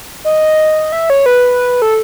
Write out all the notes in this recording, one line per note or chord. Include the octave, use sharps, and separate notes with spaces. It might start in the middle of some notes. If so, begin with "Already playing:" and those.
D#5
E5
C#5
B4
A4